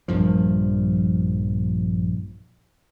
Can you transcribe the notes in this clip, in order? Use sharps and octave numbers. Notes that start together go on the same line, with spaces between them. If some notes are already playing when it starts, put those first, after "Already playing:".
A#1 G2 F3